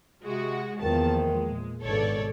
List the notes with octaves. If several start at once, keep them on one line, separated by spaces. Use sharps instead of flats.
C3 G#3 F#4
E2 D#3 F3 A#3 A5
G#3
A#2
G#1 G2 B2 A4 C#5 D5